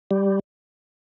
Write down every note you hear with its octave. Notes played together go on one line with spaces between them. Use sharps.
G3